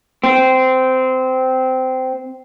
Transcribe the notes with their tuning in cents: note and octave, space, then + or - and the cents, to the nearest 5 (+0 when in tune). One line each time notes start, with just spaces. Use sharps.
C4 -15